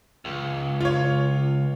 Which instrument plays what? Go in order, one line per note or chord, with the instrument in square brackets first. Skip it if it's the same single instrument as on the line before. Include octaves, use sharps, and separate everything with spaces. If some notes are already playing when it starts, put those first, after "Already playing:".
[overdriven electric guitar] C#2
[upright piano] F4 C#5